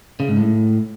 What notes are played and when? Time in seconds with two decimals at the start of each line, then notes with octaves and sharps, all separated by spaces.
0.20 C#3
0.28 G#2
0.37 A2